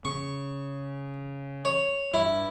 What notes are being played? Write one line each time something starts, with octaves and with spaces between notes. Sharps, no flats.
C#3 C#6
C#5
G2 E4